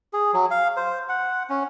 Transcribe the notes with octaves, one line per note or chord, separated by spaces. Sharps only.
G#4
F#3
F5
C5
F#5
C#4